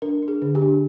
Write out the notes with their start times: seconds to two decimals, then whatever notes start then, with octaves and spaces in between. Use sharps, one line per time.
0.02 D4 A#4
0.22 D4
0.28 G#4
0.42 D3
0.55 G4
0.62 D4